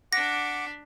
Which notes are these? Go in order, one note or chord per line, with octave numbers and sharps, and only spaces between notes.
D4 F#5 D6 A#6 B6